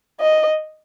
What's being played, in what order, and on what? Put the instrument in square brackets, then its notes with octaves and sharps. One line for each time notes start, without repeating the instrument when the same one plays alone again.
[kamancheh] D#5